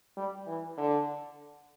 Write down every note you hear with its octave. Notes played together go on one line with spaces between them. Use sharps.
G3
E3
D3